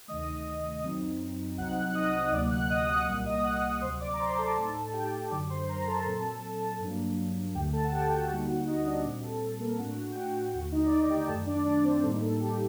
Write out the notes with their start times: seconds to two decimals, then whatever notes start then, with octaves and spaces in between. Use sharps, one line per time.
0.08 D2 C3 D#3 A3 D#5 D#6
0.83 F#2 F#3 C4 D#4
1.58 C2 C3 F#3 C4 D#4 F#5 F#6
1.87 F#6
1.95 D#5 D#6
2.32 D2 C3 F#3 A#3 D5 D6
2.51 F#5 F#6
2.70 D#5 D#6
2.88 F#5 F#6
3.07 C2 A#2 G3 A#3 F#5 F#6
3.26 D#5 D#6
3.44 F#5 F#6
3.62 F#5 F#6
3.81 D2 C3 F#3 C5 C6
4.00 D5 D6
4.13 A#5
4.19 C5 C6
4.38 A4 A5
4.56 A2 A3 D#4 A4 A5
4.93 G4 G5
5.30 F#2 D3 F#3 D5 D6
5.50 C5 C6
5.68 A#4 A#5
5.87 A4 A5
6.06 A#2 F#3 C4
6.80 G2 F#3 A#3 D4
7.54 D2 D3 A3 G4 G5
7.73 A4 A5
7.84 F#5
7.92 G4 G5
8.02 G5
8.11 F#4 F#5
8.29 D2 D3 G3 A#3 D#4 F#4 F#5
8.48 F#4 F#5
8.67 D#4 D#5
8.85 D4 D5
9.05 A#2 G3 C4
9.23 A4
9.42 A4
9.60 A#3 A#4
9.78 A2 A3 D4 F#4 F#5
10.11 G5
10.16 F#4 F#5
10.53 D#2 D3 A3 F#4 F#5
10.72 D#4 D#5
10.86 D5
10.90 D#4 D#5
11.09 G4 G5
11.27 F#2 D#3 A3 A4 A5
11.46 D4 D5
11.65 D4 D5
11.83 C4 C5
12.03 A2 G3 A#3 D#4 A4
12.21 A4
12.40 G4